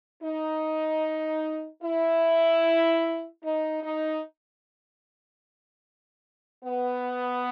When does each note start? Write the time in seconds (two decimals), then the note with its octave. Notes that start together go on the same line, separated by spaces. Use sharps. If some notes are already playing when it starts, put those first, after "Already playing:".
0.23 D#4
1.83 E4
3.44 D#4
3.83 D#4
6.64 B3